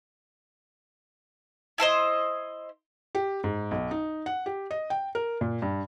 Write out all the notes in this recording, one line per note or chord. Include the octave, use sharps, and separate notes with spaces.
E4 A4 C5 D#5
G4
G#2
B1
D#4
F#5
G4
D#5
G5
A#4
A#2
G2